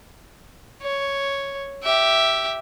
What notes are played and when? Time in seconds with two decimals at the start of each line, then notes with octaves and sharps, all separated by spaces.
0.83 C#5
1.83 G4 E5